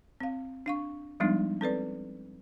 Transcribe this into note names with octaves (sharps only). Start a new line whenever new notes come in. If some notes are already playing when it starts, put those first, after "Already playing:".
C4 F5
D4 F5 C#6
F3 G3 G#3 B3 D4 D#4
C4 A4 B4 D5